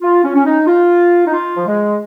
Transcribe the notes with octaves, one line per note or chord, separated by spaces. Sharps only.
F4
C#4
C#4
D#4
F4
D#4
F4
F3
G#3